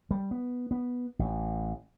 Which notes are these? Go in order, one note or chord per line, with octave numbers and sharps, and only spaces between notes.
G3
B3
B3
A1